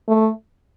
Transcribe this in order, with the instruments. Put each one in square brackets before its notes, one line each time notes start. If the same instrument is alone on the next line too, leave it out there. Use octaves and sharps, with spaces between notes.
[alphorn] A3